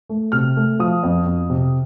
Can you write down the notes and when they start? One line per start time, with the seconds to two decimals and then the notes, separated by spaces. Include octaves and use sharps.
0.09 A3
0.32 C3 F6
0.57 A3
0.79 F3 D#6
1.03 F2
1.26 F2
1.50 C3